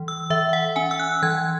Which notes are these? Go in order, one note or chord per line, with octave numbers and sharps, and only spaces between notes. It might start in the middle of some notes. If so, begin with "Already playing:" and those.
Already playing: E3
E6
E3 E5
F#5
C#4 G#5
E6
F#6
E3 G#6